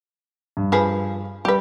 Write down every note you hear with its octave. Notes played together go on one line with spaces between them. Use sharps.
G2
F3 G#4 B4
G3 G4 B4